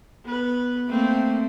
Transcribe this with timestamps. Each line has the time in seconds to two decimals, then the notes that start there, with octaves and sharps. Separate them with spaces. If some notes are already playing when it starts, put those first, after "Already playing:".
0.24 B3 B4
0.89 A3 A#3 C4